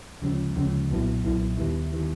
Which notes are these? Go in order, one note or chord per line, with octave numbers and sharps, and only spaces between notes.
D2 C#3 F3 G#3 C#4
D2 C#3 F3 G#3 C#4
B1 A#2 F#3 B3 E4
B1 A#2 F#3 B3 E4
D#2 D#3 G3 B3 E4
D#3 G3 B3 E4